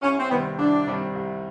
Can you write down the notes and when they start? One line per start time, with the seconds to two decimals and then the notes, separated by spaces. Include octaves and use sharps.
0.02 C2 C#4
0.20 C4
0.30 C3 D#3 G3 B3 C4
0.59 C2 D4
0.87 C3 D#3 G3 C4
1.15 C2